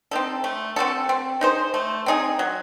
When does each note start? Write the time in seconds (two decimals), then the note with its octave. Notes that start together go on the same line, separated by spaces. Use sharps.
0.11 C4 D#4 A4
0.44 A3
0.76 C4 F#4 A4
1.09 C4
1.41 D#4 G#4 C5
1.74 A3
2.06 C4 D#4 G#4
2.39 F#3